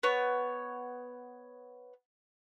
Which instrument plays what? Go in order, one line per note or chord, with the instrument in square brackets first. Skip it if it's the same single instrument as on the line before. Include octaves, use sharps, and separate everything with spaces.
[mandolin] B3 C#5